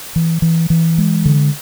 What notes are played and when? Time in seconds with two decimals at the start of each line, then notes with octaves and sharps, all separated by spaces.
0.16 E3
0.42 E3
0.70 E3
0.98 G#3
1.25 D3